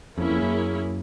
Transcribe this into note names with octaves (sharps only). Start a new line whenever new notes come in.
F2 A#3 C#4 E4 G#4
F2
F#2